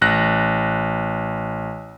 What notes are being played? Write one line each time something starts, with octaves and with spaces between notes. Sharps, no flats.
A1 F#6 A#6